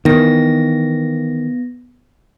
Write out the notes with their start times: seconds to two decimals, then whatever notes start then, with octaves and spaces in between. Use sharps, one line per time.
0.05 D#3 E3 B3 A#6